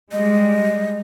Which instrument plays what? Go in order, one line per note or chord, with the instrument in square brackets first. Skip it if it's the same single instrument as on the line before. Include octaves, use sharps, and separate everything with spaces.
[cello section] G3 G#3 [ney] D#5